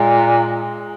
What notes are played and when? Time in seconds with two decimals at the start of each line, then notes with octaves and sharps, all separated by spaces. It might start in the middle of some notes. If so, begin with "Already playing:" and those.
Already playing: A#2 G#3